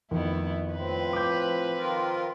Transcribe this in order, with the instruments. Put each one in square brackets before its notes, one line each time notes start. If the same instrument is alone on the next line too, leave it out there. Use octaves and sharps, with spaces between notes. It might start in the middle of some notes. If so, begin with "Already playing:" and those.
[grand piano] F2 D#3 [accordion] A3 [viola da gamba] B3 E4
[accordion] A2 [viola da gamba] F3 B4 [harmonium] C4
[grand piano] D6 G6
[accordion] D#3 F4 A#4